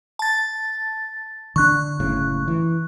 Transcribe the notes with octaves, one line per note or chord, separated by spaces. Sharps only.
A5 A6
D3 D4 C#6 F#6
F#1 A2 C#3
E3